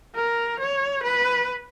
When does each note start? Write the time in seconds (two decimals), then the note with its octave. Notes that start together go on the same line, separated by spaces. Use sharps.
0.15 A#4
0.60 C#5
1.04 B4